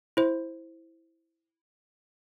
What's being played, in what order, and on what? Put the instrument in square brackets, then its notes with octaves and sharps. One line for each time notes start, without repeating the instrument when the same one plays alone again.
[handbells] E4 C5